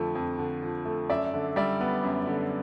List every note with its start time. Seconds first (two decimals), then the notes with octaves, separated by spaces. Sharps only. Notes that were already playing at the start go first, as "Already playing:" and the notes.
Already playing: F2 D3 F3 A3
0.15 F2
0.39 D3
0.63 F3
0.85 A3
1.10 F#2 D5 E5
1.34 D3
1.56 G3 D5 E5
1.81 B3
2.04 F#2
2.27 D3